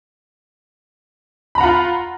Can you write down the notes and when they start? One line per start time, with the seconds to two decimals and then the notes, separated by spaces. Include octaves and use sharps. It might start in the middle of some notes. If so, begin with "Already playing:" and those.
1.55 B5
1.58 A#5
1.61 F#5
1.63 F4